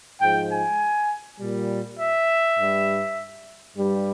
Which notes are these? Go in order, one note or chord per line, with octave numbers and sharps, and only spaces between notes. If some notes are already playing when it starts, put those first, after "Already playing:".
G#2 F3 G#3 G5
G#5
A#2 G3
E5
G2 G3
G2 G3